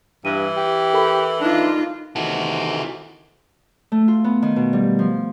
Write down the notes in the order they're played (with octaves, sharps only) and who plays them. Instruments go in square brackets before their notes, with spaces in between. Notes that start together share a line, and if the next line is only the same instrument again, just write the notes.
[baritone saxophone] G2 [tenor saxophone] E3 [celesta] D#7
[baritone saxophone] G4
[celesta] A4 A#4 B5
[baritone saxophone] D4 [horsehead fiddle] D#4 F4
[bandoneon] C3 D#3 E3 [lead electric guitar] F#4 A4
[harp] A3
F4
B3
D#3
B2
G3
F3